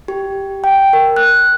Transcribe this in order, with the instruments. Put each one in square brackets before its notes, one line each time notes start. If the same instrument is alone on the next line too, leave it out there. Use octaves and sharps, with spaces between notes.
[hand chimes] G4
G5
A#4
F#6